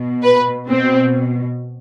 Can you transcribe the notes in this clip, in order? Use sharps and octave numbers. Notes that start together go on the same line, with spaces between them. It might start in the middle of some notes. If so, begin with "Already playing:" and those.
Already playing: B2
B4
B2 C4